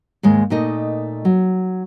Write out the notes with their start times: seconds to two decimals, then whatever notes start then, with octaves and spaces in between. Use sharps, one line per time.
0.23 D#2 G#2 G#3
0.50 A#2 A3 D#4 D#5
1.25 F#3